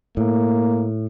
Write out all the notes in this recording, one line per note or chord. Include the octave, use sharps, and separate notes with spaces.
A2 A#3